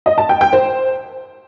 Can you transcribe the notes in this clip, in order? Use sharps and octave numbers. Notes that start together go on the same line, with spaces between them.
D#5
A5
G5
G5
C5